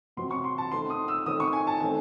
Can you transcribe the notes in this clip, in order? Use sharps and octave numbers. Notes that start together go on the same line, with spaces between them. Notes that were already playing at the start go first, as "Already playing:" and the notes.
C3 F#3 C4 C6
C#6
C6
A5
D#3 A3 C4 C6
D#6
E6
D#3 A3 C4 D#6
C#6
G#5
A5
D#3 A3 C4 G#5